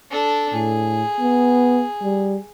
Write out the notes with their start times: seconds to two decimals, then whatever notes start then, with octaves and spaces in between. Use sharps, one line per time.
0.11 D4 A4
0.53 A2 G#4
1.20 B3
2.02 G3